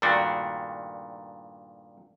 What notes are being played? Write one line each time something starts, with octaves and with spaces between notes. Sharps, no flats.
G2 A#2 D#3 A3 D4 F#4